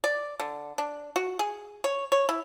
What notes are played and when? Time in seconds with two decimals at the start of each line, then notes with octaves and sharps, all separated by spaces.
0.04 D5
0.39 D3
0.78 D4
1.16 F#4
1.39 G#4
1.84 C#5
2.12 C#5
2.29 E4